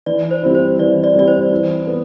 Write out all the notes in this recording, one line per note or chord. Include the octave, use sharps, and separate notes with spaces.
E3 D5
C5
G3 C4 E4
C5
E3 D5
D5
G3 C4 E4 D5
C5
E3
B3